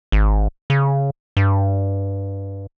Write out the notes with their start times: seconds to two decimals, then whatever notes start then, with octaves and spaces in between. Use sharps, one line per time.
0.12 G#1
0.70 C#3
1.37 G2